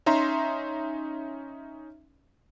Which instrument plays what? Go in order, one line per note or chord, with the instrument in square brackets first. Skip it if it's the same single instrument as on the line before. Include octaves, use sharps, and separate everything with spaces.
[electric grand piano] C#4 D#4 E5 A#5 C6